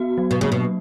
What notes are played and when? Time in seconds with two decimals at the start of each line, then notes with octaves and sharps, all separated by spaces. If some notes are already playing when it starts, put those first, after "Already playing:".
Already playing: B3 F#4
0.18 F#3
0.31 B2
0.41 C#3 A#3
0.52 B2